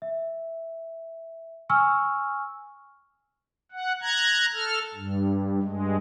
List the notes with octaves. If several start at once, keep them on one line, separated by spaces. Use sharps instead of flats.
E5
G#5 C#6 E6 F6
F#5
A#5 F#6 G#6
A4 F6
G2
G2 G#3